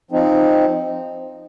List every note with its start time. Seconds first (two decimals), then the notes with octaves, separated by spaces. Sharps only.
0.11 F3 C4 D#4